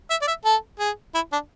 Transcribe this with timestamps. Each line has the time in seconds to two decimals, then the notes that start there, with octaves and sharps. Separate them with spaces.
0.10 E5
0.22 D5
0.28 E5
0.45 A4
0.79 G#4
1.14 E4
1.32 D4